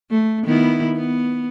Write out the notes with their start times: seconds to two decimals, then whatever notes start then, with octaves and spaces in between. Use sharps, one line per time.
0.11 A3
0.44 D#3 B3 E4
0.96 B3